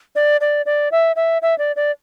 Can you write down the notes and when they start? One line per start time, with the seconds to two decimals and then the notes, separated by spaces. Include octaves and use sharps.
0.16 D5
0.41 D5
0.66 D5
0.92 E5
1.16 E5
1.42 E5
1.58 D5
1.76 D5